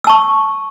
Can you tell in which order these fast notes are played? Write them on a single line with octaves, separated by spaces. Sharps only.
E6 A5 C#6